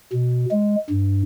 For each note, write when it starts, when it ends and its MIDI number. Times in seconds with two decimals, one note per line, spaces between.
0.13 0.46 47
0.51 0.76 56
0.90 1.23 43